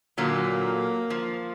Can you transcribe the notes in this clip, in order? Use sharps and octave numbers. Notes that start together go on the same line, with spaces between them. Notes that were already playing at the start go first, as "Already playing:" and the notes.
A#2 D3 F#3 A#3
F3